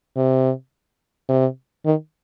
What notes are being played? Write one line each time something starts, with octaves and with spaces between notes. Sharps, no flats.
C3
C3
D#3